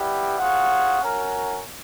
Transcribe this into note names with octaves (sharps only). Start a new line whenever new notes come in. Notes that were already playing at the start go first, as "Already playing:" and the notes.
Already playing: G3 B3 E4 G4 B4
F4 G#4 C#5 F#5
C#4 F#4 A#4